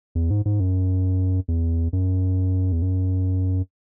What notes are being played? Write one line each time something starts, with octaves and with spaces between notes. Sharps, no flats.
E2
G#2
G#2
F#2
E2
F#2
E2
F#2